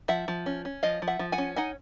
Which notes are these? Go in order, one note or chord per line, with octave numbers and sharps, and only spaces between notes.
F3 E5 F#5
F3
C#4
C#4
F3 D#5 F5
F3
E5 F#5
F3
F#5 G#5
C#4
D#4 F#5 G#5